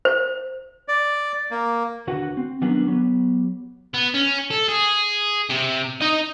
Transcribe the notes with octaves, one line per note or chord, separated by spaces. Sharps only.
C5
D5
A#3
D#2 D3 F#4 B4 F#5
C4
D#3 F#3 G3 B3 C#4 D4
F#3 B3 G4
B3
C#4
A4
G#4
C3
D#4 D#5